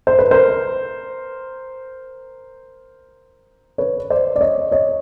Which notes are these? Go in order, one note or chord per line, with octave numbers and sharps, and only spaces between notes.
C5
B4
A#4 C5
B4 C#5
C5 D5
D5
C#5 D#5
C#5 D#5